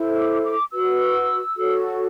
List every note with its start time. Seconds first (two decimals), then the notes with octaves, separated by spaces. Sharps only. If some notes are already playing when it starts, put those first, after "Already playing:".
Already playing: E4 A4 C5
0.17 D6
0.44 D6
0.72 F#4 B4 E6
1.57 F#4 A4 C#5